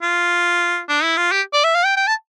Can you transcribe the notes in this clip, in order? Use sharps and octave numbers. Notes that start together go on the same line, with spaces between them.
F4
D4
E4
F4
G4
D5
E5
F5
G5
G5
A5